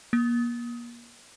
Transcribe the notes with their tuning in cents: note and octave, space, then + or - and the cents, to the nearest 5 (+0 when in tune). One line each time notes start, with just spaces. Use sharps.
A#3 +35